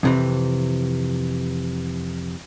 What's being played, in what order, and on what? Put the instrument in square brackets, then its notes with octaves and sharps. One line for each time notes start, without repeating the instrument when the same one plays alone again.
[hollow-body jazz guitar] F2 C3 E3